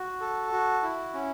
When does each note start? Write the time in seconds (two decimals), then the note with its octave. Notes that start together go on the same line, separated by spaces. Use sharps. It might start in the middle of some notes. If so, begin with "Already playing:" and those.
Already playing: F#4
0.21 A4
0.52 F#4
0.83 E4
1.14 C#4